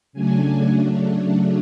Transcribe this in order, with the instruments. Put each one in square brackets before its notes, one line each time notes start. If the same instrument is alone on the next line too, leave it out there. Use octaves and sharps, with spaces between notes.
[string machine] C#3 F#3 A3 D4 G#5